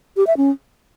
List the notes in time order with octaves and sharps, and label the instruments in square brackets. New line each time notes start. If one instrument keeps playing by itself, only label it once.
[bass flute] G4
E5
C#4